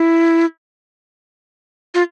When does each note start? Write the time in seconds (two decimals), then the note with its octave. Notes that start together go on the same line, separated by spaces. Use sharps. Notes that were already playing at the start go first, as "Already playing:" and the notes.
Already playing: E4
1.94 F4